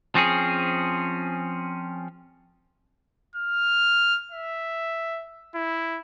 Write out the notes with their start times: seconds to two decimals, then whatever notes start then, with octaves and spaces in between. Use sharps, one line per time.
0.15 F3 C4 C#4 G#4
3.36 F6
4.32 E5
5.55 E4